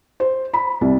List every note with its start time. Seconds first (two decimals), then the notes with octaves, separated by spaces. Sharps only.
0.20 C5
0.54 B5
0.81 C2